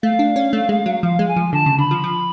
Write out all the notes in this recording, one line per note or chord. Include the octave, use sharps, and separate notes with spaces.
A3 F5
D4
C#4
A3
G#3
F#3
F3 F5
G#3
G#5
F3
D3 A5
C#3
D3 B5
F3
F3